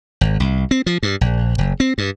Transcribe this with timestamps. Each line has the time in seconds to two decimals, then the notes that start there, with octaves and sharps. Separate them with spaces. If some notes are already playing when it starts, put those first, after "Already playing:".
0.21 G#1
0.40 C2
0.71 C4
0.86 F3
1.03 G2
1.21 A#1
1.58 F#1
1.80 C4
1.98 G2